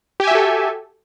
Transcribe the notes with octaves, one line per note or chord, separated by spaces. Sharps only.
F#4 G4 A4 E5 G#5